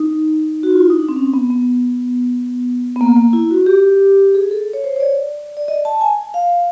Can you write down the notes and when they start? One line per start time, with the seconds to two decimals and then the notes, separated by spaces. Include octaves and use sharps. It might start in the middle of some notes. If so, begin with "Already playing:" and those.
Already playing: D#4
0.63 F#4
0.73 F4
0.82 E4
0.90 D#4
0.99 D4
1.09 C4
1.16 C#4
1.34 B3
1.50 B3
2.96 B3
3.01 A#3
3.16 A#3
3.33 E4
3.50 F#4
3.66 G4
4.35 G#4
4.51 A4
4.73 C#5
4.84 C5
4.96 C#5
5.00 D5
5.57 D5
5.68 D#5
5.85 A5
6.01 G#5
6.34 F5